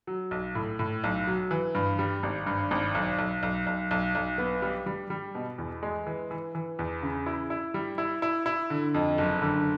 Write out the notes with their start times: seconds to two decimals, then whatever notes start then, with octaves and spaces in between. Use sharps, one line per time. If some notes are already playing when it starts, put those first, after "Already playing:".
0.07 F#3
0.31 B1
0.55 A2
0.79 A2
1.04 B1
1.27 F#3
1.51 E3
1.75 G2
1.99 G3
2.23 G#1
2.46 G2
2.71 G#1
2.95 B1
3.18 B1
3.43 B1
3.67 B1
3.91 B1
4.15 B1
4.38 B3
4.62 G3
4.86 G3
5.10 G3
5.35 B2
5.58 E2
5.83 G#3
6.07 E3
6.31 E3
6.55 E3
6.79 E2
7.03 C#3
7.26 E4
7.50 E4
7.74 G3
7.98 E4
8.22 E4
8.46 E4
8.70 D3
8.94 F2
9.18 F#1
9.42 D3